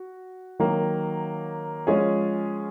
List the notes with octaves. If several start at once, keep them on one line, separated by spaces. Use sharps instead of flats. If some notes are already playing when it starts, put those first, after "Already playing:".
Already playing: F#4
D#3 F#3 A#3
F3 G#3 C#4 F4 G#4